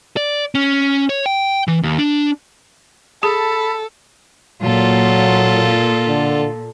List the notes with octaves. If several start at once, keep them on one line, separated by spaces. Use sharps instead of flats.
D5
C#4
C#5
G5
E3
D#2
D4
G#4 A4 A5 B5
A#2 F#3 F4 A4
D3